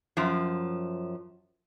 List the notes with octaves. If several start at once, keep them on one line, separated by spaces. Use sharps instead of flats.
F#2 F3